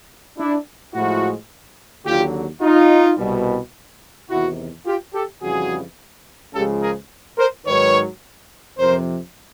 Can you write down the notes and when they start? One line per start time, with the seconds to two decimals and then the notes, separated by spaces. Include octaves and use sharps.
0.37 D4 E4
0.94 A2 F3 G#3 E4 F#4
2.06 D#2 D3 F#3 F4 G4
2.62 D#4 F4
3.18 C2 B2 G3
4.30 E2 C3 D#3 E4 F#4
4.86 F4 G4
5.14 G4 A4
5.41 F2 C#3 E3 G3 F#4 G#4
6.54 C#2 C#3 F3 G#3 G4 A4
6.82 G#4 A#4
7.38 A#4 C5
7.66 G#2 D#3 F#3 B4 C#5
8.77 F2 C3 F3 A#4 C5